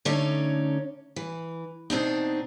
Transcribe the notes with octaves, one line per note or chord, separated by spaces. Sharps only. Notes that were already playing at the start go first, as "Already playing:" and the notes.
D3 A3 C#4 D#4 C#5 D5
E3
B2 C4 D4 D#4